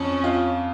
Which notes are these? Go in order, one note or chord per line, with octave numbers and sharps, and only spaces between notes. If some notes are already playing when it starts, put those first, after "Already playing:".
Already playing: F2 C#4
F4